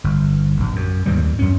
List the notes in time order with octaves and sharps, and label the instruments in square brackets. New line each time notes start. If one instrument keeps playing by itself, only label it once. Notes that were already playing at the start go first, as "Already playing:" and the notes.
[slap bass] G1
A#1
F#2
D#2 G#2 E3 G3
F#2 C#4